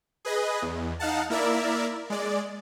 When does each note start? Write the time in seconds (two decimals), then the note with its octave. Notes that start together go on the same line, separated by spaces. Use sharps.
0.25 G#4 B4 D#5
0.62 E2
1.00 D#4 F5 F#5 A5
1.30 A#3 E4 A#4 D5 E5
2.10 G#3 D5